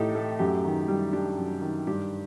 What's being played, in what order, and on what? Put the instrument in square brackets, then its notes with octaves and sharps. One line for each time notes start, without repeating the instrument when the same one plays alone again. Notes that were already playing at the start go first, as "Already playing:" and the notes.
Already playing: [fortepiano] A2 D#4 G4 A4
A3
F#2 G4
D#3
G3
D4 G4
F#2
D#3
G2 G4